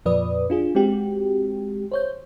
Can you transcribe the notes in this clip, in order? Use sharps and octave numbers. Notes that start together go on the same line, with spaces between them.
F2 A#2 F3 B4 D5 D#6
D4 F4 G#4
G#3 C4 F#4 G4
C5 C#5 G6